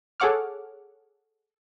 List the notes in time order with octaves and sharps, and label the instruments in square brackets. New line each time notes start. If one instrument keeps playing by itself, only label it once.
[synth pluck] G#4 A4 C#5 F#5 D6 F6